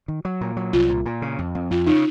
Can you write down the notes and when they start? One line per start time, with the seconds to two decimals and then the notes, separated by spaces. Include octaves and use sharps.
0.08 D#3
0.25 F#3
0.41 A#2
0.57 F#3
0.73 C2 F4
0.89 A#2
1.06 A#2
1.22 C#3
1.39 F2
1.55 F2
1.71 F2 F4
1.87 C#3 D#4